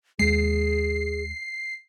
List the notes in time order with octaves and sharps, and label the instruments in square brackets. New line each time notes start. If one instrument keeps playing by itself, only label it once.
[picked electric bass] D#2 G#3 [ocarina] G#4 [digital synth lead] C7